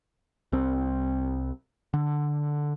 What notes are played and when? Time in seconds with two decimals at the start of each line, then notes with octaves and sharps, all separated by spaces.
0.52 C2 C4
1.94 D3